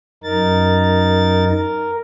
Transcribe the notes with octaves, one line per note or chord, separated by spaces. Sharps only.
F#2 D#4 A#4 A6
A#4